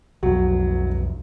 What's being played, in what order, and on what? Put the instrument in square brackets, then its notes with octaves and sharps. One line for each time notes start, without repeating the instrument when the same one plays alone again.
[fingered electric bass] B1 F2 [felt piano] F#3